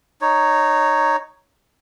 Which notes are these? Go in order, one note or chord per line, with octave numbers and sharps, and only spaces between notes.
D#4 C#5